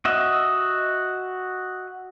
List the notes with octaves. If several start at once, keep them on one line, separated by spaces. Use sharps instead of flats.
F#4 D#5 E5